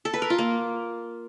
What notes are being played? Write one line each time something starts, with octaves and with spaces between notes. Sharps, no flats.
A4
B4
A#4
F4
A#3